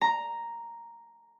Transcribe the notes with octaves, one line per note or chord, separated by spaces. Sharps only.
A#5